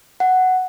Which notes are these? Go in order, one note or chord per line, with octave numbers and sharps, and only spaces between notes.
F#5